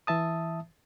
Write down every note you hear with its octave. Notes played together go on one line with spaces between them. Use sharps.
E3 E5 A5 D#6